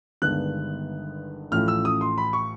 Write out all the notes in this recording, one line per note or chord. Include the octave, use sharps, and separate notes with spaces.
G1 G2 D#3 G#3 B3 F#6
A1 A2 F3 A3 C#4 F6
E6
D#6
C6
B5
C#6